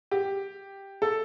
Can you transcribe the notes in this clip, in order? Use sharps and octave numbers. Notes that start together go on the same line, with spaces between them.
G4
A4